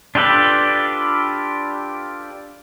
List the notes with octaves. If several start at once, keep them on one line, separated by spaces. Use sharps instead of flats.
D4 F4 G4 A4 B4